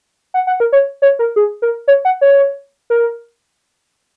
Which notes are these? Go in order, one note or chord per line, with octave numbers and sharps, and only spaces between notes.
F#5
F#5
A#4
C#5
C#5
A#4
G#4
A#4
C#5
F#5
C#5
A#4